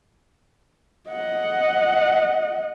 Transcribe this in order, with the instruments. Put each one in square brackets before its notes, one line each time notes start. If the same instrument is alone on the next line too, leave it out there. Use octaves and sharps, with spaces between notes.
[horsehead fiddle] D#5 F#5